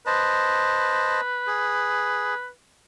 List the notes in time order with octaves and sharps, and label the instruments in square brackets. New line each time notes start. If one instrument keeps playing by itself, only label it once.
[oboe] B4 [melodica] C5 D#5 A5
[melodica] G#4